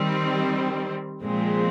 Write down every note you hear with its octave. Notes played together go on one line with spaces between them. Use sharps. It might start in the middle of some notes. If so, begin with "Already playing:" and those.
Already playing: D#3 G3 C4
A#2 F3 G#3 C4